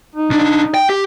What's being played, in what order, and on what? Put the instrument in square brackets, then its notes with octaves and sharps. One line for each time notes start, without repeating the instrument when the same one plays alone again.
[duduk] D#4
[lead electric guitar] B1 D4
G5
G4